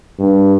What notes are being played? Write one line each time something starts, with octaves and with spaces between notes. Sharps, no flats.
G2